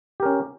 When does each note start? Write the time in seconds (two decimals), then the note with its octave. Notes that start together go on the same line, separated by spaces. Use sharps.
0.20 G4
0.23 A#4
0.25 C#4